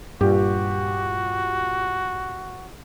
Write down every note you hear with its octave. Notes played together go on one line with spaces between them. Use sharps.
G2 A#2 F#4 G4